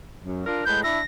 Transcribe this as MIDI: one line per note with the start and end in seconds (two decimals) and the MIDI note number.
0.23 0.40 42
0.45 0.61 62
0.45 0.61 65
0.45 0.61 70
0.65 0.82 45
0.65 0.82 56
0.65 0.82 71
0.65 0.81 91
0.83 0.99 62
0.83 0.99 64
0.83 1.05 94